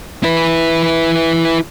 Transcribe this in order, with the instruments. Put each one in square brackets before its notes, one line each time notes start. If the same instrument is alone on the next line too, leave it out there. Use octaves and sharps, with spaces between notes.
[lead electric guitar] E4 B4